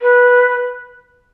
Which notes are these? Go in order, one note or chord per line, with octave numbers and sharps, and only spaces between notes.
B4